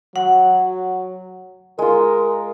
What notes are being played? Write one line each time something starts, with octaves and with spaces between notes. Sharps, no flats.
F#3 F#5
G#3 F4 A#4